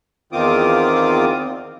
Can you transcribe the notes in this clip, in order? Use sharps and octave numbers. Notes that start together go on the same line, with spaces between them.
E2 D#3 C4 F4 D6 D#6